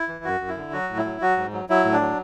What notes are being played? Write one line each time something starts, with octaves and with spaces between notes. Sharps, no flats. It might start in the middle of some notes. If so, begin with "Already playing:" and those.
Already playing: E4
E3
F#2 F#4
F#2
E4
D3
F#3 F#4
A2
E4
F#3
F#3 F#4
G#2
F#3
F#3 E4
A2
D4
F#3